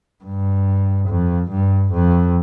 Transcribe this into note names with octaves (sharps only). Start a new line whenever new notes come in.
G2
F2
G2
F2